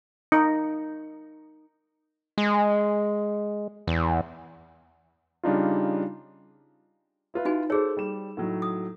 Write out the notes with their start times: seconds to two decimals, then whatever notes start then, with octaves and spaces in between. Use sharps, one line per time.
0.32 D#4
2.38 G#3
3.87 E2
5.44 C#3 G3 D4 D#4 F4
7.34 E4 F4 B4
7.45 D#4 F#4 G#5
7.70 G#4 A4 C5 C#5
7.97 G3 E7
8.37 A2 F#3 D#4
8.62 D#6